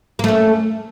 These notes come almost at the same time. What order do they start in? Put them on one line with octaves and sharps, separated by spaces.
A#3 A3 C#4